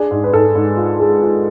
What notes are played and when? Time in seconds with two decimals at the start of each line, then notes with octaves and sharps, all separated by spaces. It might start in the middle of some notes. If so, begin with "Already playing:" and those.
Already playing: D4 G#4
0.11 G#2
0.24 B4
0.33 G#2 A4
0.55 G#2
0.77 F4
1.00 G#3
1.23 F4